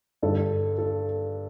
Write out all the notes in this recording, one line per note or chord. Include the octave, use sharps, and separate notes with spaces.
G2 D3 A4
A4